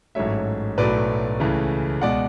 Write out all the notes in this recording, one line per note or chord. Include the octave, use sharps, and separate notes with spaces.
A1 G#2 F#3 A3 C#5 E5
B1 A2 F#3 A3 B4 D5
C#2 C#3 E3 A3
C#2 B2 G#3 D5 F#5